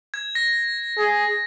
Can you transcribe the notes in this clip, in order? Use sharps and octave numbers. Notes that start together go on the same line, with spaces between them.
G#6
A#6
G#4